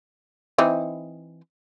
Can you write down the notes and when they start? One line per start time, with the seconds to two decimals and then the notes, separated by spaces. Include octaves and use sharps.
0.58 E3 C4 D#4